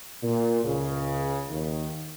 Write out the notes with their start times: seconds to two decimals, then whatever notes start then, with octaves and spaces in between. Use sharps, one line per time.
0.23 A#2
0.65 C#2 C#3
1.50 D#2 D#3